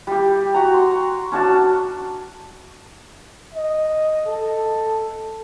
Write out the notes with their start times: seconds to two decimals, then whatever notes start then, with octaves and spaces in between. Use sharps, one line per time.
0.07 G3 G4
0.54 F#4 A#5
0.74 C6
1.32 C#4 D4 F#4 A5
3.54 D#5
4.27 A4